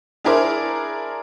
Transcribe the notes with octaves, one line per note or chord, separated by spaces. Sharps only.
D4 E4 G#4 A#4 C5 D5